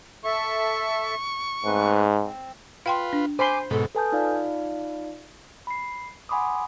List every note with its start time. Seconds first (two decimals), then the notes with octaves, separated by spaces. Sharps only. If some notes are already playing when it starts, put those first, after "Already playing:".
0.25 A4 E5 C#6
1.65 G#2 A3 C4 B4
2.24 C4
2.86 F4 B4 F5 G5 C6
3.13 D4
3.39 C5 G#5 B5 C6 D6
3.71 G#2 B2 A4
3.95 A4 B4 G#5 A5 D#6 G6
4.12 D#4 F4 D5 F5
5.67 B5 C7
6.29 F#5 G#5 B5 C6 D6 D#6